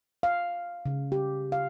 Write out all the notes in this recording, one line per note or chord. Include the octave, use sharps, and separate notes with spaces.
F5
C#3
G4
F5